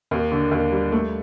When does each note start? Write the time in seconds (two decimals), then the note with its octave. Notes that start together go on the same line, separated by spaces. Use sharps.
0.11 D#2
0.32 D3
0.51 D#2
0.72 G3
0.92 A3